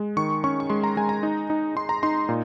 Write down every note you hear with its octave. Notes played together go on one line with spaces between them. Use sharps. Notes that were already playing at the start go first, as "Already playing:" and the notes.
Already playing: G#3
D#3 C#6
C#4 C#6
C#6
G#3 C6
A#5
G#3 G#5
A#5
D#4
D#4
D#4 C6
A#5
D#4 C6
A#2